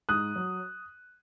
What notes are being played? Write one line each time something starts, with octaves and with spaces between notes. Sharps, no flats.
G#2 D#6 F#6
F#3